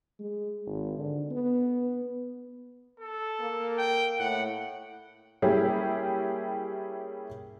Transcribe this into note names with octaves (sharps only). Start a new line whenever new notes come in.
G#3
G#1
D3
B3
A4
A#3
G5
A2 F#5
G3 A#3 C#4 E4 G4 G#4